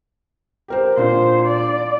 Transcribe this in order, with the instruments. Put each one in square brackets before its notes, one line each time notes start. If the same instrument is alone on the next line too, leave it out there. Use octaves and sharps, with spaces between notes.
[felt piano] G4 A#4 C5
[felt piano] A#2 D4 [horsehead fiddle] C5
[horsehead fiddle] D5